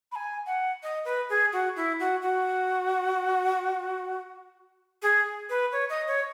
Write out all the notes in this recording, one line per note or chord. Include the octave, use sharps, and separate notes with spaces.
B5
G#5
F#5
D#5
B4
G#4
F#4
E4
F#4
F#4
G#4
B4
C#5
D#5
C#5